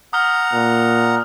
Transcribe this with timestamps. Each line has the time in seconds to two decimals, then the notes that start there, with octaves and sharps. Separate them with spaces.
0.13 F#5 A#5 D#6 F6
0.53 A#2